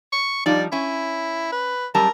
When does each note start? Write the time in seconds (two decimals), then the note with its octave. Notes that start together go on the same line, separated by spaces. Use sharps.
0.13 C#6
0.46 F3 G3 D#4 D5
0.72 C#4 E4
1.52 B4
1.95 F#2 G3 A#4 A5